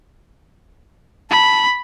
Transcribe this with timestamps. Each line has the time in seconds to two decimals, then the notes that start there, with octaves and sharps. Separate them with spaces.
1.31 A5 B5